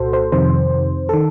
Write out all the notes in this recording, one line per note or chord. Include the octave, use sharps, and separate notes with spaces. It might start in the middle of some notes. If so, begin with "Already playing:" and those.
Already playing: C2 A#2 F#4 A4 C5
C5
F2 C3 D#3 C5
D#3 A4